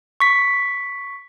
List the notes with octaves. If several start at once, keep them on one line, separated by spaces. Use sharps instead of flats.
C#6 B6